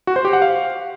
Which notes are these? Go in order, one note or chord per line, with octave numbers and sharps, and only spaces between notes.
F#4
C5
G4
F#5
F5